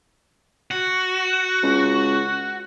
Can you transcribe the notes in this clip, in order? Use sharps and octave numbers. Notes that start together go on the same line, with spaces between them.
F#4
C#2